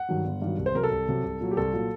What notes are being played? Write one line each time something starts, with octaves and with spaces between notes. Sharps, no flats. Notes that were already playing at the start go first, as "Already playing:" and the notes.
Already playing: F#5
G2 D#3 F#3
G1
G2 D#3 F#3
C2
C5
C3 F#3 A#4
A4
C2
C3 F#3
C2
A#2 F#3
G4
C2 A4
A#2 F#3